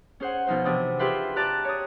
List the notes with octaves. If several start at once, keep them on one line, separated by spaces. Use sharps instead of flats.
C#4 G#4 C5 F#5
B2 F3 D#4 C5
C3 E3 D4 D#6
F4 G4 G#4 B4 E5 C6
G4 D5 A5 A#5 F#6
C#5 D#6